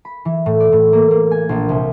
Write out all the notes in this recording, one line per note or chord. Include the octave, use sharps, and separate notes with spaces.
B5
E3
A2
D5
A2
A#3
A#3
G#5
A#1
C2